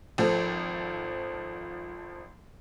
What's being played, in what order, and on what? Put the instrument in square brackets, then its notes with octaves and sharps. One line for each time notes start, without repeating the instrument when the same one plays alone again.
[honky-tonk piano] G#1 F3 A4